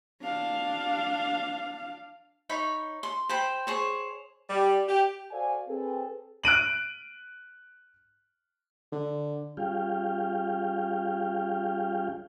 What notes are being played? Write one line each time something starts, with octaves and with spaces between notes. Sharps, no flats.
D4 F5
D#4 C#5 B5
C6
C5 G5 B5
G#4 C5 C#5
G3
G4
F#4 A4 C5 D5 F5 G#5
C4 G#4 A4 B4
F#6 D7 D#7 F#7
D3
G3 C#4 F4 G#4 F5 G5